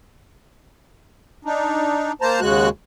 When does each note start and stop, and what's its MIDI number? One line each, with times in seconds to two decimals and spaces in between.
1.45 2.12 62
1.45 2.12 63
2.21 2.40 58
2.21 2.40 72
2.21 2.40 81
2.21 2.40 82
2.41 2.69 39
2.41 2.69 49
2.41 2.69 56
2.41 2.69 66
2.41 2.69 90